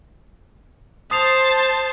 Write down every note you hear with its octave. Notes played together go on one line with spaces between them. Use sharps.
C5 A5 D#6 C7 F7